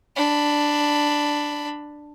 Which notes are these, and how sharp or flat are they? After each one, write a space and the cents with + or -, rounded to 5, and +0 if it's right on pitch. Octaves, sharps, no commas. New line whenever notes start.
D4 +5 B5 +0